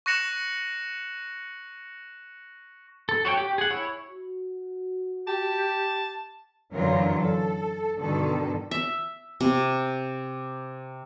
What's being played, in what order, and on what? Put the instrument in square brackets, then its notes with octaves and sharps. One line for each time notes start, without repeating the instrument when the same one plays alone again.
[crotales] C#6 F#6 A#6 C#7 E7 F#7
[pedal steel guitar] A4
F#4 C#5 E5 G5
G4
G#4 F#5
E4 C#5
[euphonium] F#4
[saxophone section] G4 [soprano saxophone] A5
[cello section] F#2 D3 E3 F#3 F4 A#4
A4
G2 B2 D3 D#3 A4
[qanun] E5
C3